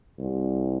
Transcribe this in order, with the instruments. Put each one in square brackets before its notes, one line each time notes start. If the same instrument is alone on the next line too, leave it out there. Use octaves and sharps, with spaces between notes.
[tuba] C2